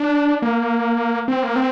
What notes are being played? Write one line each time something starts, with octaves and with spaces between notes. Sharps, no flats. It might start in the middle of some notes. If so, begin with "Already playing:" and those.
Already playing: D4
A#3
C4
A#3
C4